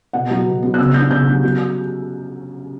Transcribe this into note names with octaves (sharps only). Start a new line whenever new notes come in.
B2 F#5
F#3 B3
B2
F#3 B3
F#6
C#3 E6
F#3 B3 D4 G6
C#3 G6
F#3 B3 D4
F#3